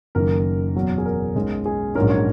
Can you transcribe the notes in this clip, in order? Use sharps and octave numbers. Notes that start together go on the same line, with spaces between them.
F#1 F#2 D#3 A#3 A#4
E2 B2 F#3
G#4
A#4
B1 B2 G#3 C#4
G#4
A#1 G#2 F#3 C#4 A#4
C#5